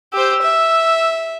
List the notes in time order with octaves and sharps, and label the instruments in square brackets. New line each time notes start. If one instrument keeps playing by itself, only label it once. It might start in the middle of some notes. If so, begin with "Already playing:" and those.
[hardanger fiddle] G4 C5 [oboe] E6
[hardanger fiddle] E5